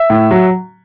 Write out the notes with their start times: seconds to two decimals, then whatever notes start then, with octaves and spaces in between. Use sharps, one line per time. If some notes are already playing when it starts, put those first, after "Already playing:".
Already playing: E5
0.10 A2
0.31 F#3